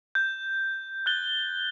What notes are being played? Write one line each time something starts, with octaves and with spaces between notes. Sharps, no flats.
G6
F#6 A6 G7